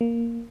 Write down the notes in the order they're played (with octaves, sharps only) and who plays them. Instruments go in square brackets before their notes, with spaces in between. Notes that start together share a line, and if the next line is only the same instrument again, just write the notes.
[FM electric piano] A#3